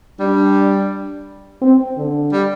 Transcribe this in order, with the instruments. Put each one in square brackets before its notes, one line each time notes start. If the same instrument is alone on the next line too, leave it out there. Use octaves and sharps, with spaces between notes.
[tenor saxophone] G3 [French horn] D4
[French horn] C4
D3
[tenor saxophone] G3